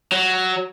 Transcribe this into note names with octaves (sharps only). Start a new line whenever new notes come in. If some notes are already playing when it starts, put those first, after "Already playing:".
F#3